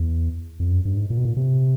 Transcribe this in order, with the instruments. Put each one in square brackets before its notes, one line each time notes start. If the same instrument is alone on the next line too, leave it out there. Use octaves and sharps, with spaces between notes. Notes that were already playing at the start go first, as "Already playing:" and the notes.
Already playing: [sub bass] E2
F2
F#2
G2
G#2
A#2
B2
A#2
C3